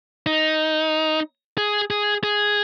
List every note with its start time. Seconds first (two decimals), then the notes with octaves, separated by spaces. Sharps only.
0.26 D#4
1.58 G#4
1.90 G#4
2.23 G#4